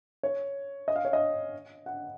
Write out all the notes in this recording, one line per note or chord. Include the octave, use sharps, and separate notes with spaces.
C#5
D#5
F5
C#5
D#5
F#5